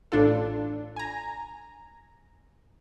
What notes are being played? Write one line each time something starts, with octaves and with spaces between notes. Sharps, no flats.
A1 A2 D4 F4 A4
G#5 A#5